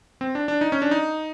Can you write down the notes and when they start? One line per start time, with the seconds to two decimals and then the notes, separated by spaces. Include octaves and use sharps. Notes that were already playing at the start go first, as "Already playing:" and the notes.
0.21 C4
0.35 D4
0.48 D4
0.61 D#4
0.72 C#4
0.82 D4
0.91 D#4